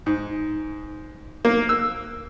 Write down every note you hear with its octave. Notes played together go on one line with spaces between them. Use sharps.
G#2
A#3
E6